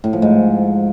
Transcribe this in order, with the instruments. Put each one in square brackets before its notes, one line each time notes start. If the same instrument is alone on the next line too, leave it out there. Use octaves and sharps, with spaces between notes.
[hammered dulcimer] A2
F3
G#2